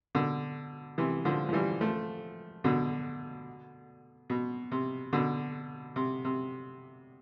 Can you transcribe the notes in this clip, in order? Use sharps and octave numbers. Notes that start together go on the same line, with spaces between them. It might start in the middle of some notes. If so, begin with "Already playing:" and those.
B2 D3
C3 E3
D3 F3
F3
E3 G3
F3 A3
B2 D3
B2
C3
B2 D3
C3
C3